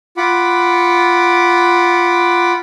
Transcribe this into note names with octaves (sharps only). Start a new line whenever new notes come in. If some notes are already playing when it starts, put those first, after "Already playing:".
F4 F#5 B5 D6